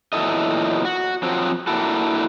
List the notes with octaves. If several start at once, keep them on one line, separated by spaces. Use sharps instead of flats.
E2 A#2 F#3 E4 A4 D#5
F#4
F3 F#3 C4
A#3 D4 E4 F#4 A4